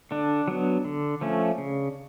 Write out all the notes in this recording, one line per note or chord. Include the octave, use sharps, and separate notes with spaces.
D3 D4
F#3 B3
D3
F3 A3 C#4
C#3